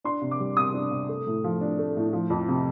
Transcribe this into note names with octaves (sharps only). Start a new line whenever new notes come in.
D4 C6
C3
D6
G3
C3 D#6
D4
C3
A3
A2
F3
D4
A3
A2
F3
F2
C3